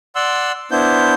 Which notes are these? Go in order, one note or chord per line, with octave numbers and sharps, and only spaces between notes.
D5 F#5 C6 E6
B3 D4 E4 C5 G6